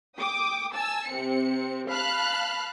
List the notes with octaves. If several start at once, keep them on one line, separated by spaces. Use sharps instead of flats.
G5 D6 D#6
G#5 A5 E6
C3 C4 C#7
F5 A5 B5 F6 F#6